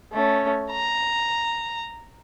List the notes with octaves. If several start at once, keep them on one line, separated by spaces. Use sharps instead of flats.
A3 C#4
A#5